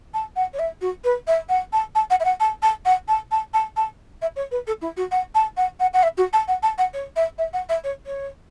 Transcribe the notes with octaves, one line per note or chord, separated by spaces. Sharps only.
A5
F#5
C#5
E5
F#4
B4
E5
F#5
A5
A5
F#5
E5
F#5
A5
A5
F#5
A5
A5
A5
A5
E5
C#5
B4
A4
E4
F#4
F#5
A5
F#5
F#5
F#5
E5
F#4
A5
F#5
A5
F#5
C#5
E5
E5
F#5
E5
C#5
C#5